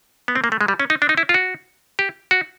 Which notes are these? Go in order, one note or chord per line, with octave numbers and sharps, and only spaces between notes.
B3
C4
A#3
A3
G#3
G3
C#4
D#4
D4
D#4
E4
F4
F#4
G4
F#4